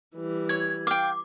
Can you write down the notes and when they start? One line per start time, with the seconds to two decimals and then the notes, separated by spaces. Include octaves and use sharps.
0.16 E3 G3
0.49 C#5 G#6
0.87 F5 G5 D6